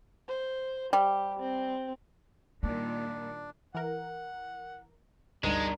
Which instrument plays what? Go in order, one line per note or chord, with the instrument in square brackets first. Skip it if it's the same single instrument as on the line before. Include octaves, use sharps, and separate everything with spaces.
[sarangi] C5
[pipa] G3 [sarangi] G4
[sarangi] C4
[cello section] A#2 D#3 G3 [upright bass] A#3 [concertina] D4
[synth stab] E3 A#4 [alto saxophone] F#5
[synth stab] G#1 D2 G3 [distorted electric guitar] G#3 [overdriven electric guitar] D4 A#4 [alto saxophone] D#4